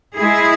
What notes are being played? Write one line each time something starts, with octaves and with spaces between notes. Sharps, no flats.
G#3 E4 G#4